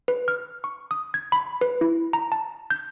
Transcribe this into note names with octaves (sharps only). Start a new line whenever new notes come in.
B4
F6
C#6
D#6
G#6
B5
B4
E4
A#5
A5
G6